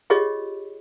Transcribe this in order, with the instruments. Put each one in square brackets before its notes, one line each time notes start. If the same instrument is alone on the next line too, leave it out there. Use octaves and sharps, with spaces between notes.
[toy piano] F4 G4 G#4 C#5 D#5